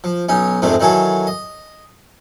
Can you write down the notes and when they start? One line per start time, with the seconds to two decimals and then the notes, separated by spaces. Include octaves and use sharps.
0.04 F3
0.29 B1 C#4 D#4
0.62 F2 G#2 C3 G#3 A3 D4
0.80 D#3 E3 F#3 F#4 G#4 A4
1.27 D#5